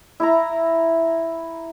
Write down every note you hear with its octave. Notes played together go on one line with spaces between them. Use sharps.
E4 E5 A#5